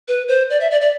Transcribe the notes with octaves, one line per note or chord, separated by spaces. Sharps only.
B4
C5
D5
E5
D5
D5